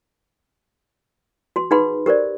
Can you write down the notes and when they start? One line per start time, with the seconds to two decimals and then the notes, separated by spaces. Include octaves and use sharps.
1.56 F#4 C6
1.71 D#4 G#4 B4 F#5 B5 C6
2.06 G4 A#4 C5 D5